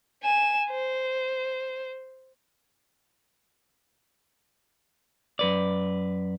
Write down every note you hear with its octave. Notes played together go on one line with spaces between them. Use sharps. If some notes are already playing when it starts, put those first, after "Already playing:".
G#5 E7
C5
F#2 B4 D5